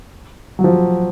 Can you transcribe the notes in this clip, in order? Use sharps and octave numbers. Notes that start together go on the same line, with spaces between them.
F#3
F3